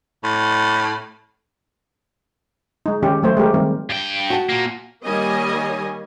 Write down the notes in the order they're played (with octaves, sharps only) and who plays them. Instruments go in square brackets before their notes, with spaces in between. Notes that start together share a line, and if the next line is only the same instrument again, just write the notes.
[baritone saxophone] A2
[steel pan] G#3 D#4
D#3 G#3 C#4 G4
F#3 A3 C5
G#3 A3 G4 A#4
D#3 G3 C4 A#4
[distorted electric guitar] G2 G5
[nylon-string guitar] F#4 A5
[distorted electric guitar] A#2 A#3
[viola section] D#3 G3 A#3 C#5 D#5 G#5